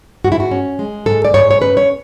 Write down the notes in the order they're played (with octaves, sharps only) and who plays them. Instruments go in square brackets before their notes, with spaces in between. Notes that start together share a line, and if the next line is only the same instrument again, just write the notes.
[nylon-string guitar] G#2 F#4
E4
F#4
C#4
G#3
G#2 A4
D5
G#2 C#5
C#5
C#4 B4
C#5